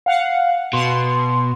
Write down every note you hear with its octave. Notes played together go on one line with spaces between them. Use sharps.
F5 F#5
B2 C6